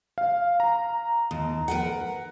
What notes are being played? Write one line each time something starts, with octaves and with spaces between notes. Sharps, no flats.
F5
A#5
D#2
A#4 B4 F#5